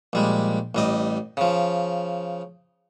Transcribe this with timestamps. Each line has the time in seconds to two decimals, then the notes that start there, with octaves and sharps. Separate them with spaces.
0.13 A#1 G3 G#3
0.75 A1 G3 D#5
1.37 C#3 F3